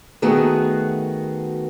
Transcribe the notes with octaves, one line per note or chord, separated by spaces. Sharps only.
D#3 A3 B3 F#4 G#4